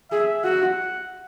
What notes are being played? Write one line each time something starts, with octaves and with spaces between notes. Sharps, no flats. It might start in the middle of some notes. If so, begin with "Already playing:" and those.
G#4 E5
F#4 F#5